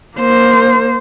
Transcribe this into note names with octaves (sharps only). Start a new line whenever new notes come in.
A#3 C5